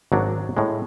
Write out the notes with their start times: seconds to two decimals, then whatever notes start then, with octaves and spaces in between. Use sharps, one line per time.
0.12 G#1 F#3 D4
0.57 A2 G#3